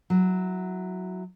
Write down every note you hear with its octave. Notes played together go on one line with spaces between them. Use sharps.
F#3 E4